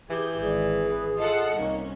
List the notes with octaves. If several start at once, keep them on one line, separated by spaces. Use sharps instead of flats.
E3 G4 G#4 G6
G#1 G#4 D5
B4
F4 A4 D#5 F#5
C2 A#3 C#4 D#4